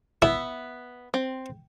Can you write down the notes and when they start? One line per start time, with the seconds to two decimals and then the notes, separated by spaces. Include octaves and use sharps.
0.22 B3 E4 E5
1.14 C4